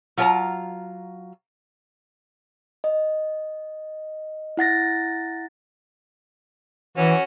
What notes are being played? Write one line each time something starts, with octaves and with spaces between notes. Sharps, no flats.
F#3 F4 A4 B4 A5 A#5
D#5
E4 F#5 A6 A#6
E3 C#4 F#4